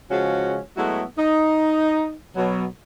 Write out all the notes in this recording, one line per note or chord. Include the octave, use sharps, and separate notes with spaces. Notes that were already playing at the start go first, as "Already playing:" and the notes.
C#3 F3 G#3 C#4 F#4
F#3 G#3 A3 B3 E4 F#4
D#4
B2 F#3